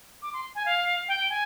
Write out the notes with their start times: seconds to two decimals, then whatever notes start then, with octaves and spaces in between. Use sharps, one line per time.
0.22 D6
0.33 C6
0.55 G#5
0.66 F5
1.08 G5
1.30 G#5